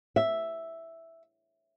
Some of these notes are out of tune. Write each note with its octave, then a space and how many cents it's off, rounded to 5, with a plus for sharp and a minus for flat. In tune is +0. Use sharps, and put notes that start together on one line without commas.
E5 +0